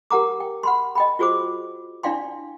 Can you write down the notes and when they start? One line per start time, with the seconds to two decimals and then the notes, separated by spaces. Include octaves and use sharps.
0.10 G4 A#4 F#5 A#5 D6
0.40 G5
0.63 F#5 B5 C6
0.95 D#5 G5 B5
1.19 F4 F#4 G#4 C5 D6
2.03 D4 E4 D5 F5 G5 C6